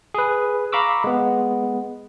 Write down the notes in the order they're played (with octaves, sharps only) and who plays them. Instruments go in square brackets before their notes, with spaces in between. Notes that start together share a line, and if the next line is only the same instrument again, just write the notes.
[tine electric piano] G#4 B4
F5 A#5 B5 C#6 D6 E6
G#3 B3